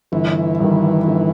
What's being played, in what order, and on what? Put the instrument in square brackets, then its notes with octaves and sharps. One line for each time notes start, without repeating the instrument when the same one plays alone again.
[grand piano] G1 [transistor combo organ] E3
[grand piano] G2 D#3
G1